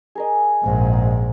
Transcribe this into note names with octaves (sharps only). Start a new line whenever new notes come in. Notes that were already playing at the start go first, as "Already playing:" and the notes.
G#4 A#4 D#5
A#1 G#2